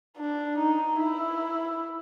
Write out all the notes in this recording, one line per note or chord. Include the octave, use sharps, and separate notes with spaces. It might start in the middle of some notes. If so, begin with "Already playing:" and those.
D4
D#4
E4